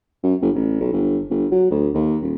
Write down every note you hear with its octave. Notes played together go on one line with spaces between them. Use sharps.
F#2
G1
A1
B1
G1
G1
F#3
D2
D#2
D#1